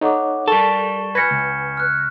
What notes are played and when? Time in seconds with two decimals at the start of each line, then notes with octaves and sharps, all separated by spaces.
0.01 D#4 A4 C#5 F#5 D6
0.48 G3 A4 A#4 A5 C#6 E7 G7
1.15 B4 G#5 F6 G6 G#6 A#6 B6 C#7
1.31 C#2
1.77 F6 F#6